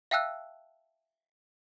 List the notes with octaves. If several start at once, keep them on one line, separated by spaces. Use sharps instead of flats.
E5 F5 G5 A5 E6 F#6